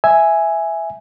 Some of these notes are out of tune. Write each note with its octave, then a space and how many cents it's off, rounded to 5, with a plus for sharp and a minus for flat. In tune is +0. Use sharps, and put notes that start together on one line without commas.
E5 +0 G#5 +0